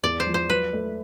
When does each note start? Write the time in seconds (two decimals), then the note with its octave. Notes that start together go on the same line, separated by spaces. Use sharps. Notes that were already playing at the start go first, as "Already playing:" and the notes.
0.03 E2 D5
0.20 C5
0.27 F3
0.34 C5
0.50 F#3 B4
0.73 A3